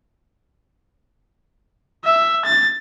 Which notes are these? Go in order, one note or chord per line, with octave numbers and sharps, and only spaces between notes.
E5
A6